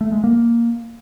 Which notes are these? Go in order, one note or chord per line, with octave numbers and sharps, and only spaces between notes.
A3
G#3
A#3